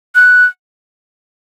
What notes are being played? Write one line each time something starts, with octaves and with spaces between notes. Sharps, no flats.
F#6